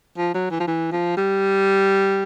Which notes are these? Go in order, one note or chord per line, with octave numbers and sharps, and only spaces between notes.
F3
F#3
E3
F3
E3
F3
G3